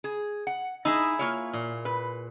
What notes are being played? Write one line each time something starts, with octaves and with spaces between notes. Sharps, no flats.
G#4
F#5
D#4 E4 G#4 E5
A#3 F4 C#5
A#2
B4